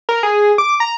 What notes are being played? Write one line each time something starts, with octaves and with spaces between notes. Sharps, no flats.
A#4
G#4
D6
A#5